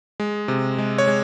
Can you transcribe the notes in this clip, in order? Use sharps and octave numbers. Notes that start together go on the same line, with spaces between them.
G#3
C3
G#3
C#5
G#3